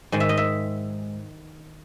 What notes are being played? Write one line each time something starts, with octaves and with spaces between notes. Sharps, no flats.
G#2 D#3 G#3
E5
D#5
E5